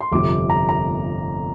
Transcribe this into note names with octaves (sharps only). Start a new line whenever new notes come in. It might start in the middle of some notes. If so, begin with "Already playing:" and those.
C6
G1 F2 C3 D6
A#5
A#5